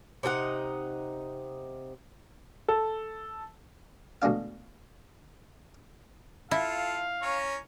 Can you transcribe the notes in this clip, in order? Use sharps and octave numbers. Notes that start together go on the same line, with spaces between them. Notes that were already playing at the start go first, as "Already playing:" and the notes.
C3 D#4 A4 F#5
A4
D2 B2 G#3 D4 F5
E4 F4 A4 F5
C#4 A#4 C#5